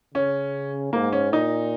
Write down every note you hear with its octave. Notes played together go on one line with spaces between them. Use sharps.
C#3 C#4
G#2 A#3
C#4
A#2 D#4